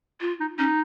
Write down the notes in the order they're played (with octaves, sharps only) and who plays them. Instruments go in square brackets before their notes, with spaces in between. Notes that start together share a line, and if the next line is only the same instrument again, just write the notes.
[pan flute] F4
[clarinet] D#4
[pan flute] C#4 [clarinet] D#4